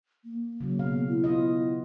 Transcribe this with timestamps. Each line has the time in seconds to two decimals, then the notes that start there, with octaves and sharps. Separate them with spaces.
0.25 A#3
0.60 C#3 F#3
0.79 B2 F5
1.08 E4
1.24 B3 F4 D#5